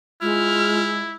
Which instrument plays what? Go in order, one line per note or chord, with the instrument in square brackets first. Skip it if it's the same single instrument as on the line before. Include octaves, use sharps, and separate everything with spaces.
[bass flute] G#3 [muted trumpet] E4 [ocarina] F4 [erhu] F6